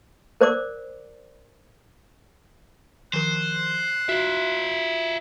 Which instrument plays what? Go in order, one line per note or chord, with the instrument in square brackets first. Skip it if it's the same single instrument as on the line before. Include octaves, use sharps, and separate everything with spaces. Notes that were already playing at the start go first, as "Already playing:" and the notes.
[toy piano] A#4 C5 D5 D6
[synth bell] D#3 F3 A#4 [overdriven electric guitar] C5 [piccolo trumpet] F#6
[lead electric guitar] F4 E5 [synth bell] F#4